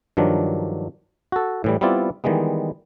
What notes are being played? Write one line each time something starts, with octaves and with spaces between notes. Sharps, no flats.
G2 D#3 F3 F#3 D4
F#4 A4
A2 E3 G3
G3 B3 C4 E4 F4 D5
D#3 E3 G3 G#3 B3